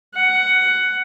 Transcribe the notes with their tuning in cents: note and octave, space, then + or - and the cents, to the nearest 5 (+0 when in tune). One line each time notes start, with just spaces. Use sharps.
F#5 +10